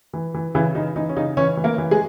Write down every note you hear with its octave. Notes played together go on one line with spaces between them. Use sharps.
E3
E3
C#3 E3 E4
E3 D#4
E3 D#4
C#4
C#3 D#4
E3 C#4 C#5
E3
A#3 A#4
E3
G#3 G#4